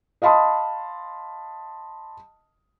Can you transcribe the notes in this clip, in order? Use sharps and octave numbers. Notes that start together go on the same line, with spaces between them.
D#5 F5 A5 B5 C6 D#6